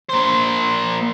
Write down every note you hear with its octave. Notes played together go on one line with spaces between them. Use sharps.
A#3 C5